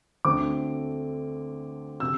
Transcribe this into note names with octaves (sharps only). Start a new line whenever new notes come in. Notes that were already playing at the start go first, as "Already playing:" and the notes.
D2 D3 A3 C4 D6
C3 E6